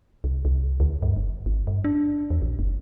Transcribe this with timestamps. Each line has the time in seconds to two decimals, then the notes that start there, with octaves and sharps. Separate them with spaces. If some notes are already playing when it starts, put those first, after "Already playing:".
0.24 C2
0.45 C2
0.80 D2
1.02 G2
1.16 F#1
1.46 G#1
1.67 G2
1.84 D4
2.30 E2
2.42 A#1
2.59 F#1